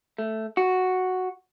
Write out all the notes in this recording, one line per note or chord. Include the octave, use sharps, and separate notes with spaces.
A3
F#4